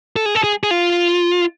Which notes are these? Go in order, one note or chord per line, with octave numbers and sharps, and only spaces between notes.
A4
G#4
A4
G#4
G#4
F4